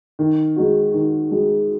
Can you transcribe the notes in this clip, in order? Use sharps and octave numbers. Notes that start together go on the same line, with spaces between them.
D#3
G#3 D#4 F#4
D#3
G#3 D#4 F#4